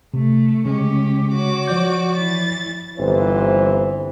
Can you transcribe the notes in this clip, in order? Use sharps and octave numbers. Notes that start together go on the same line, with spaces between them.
C3 A3
C#3 G#3 C#4 G4
F#4 C#5 D6
F3 D5 G6
E3 A6
G1 E3 C4 C5